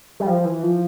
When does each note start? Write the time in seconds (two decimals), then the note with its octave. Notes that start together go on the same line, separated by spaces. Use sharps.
0.20 G3
0.27 F3
0.45 E3
0.63 F3